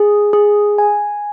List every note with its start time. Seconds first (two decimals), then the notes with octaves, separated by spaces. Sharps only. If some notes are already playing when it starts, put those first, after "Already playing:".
Already playing: G#4
0.33 G#4
0.78 G#5